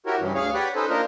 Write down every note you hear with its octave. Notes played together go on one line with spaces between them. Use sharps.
E4 F#4 G4 A#4 C#5
G2 C#3 E3
D2 G#4 C#5 F5
G4 B4 C#5 D5 F#5
C#4 D#4 A4 B4 C5
A#3 D4 D#4 F4 A#4 C5